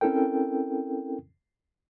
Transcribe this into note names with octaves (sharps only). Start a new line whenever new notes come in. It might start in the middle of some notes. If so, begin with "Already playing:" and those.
C4 C#4 E4 A4 A#4 G5